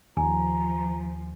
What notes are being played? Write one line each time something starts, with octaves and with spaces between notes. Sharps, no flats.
D#2 F3 G#5 A#5